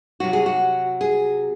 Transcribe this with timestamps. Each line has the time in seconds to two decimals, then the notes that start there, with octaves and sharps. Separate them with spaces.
0.20 C3 F#3 F#4
0.33 G#4
0.46 F#4
1.01 G#4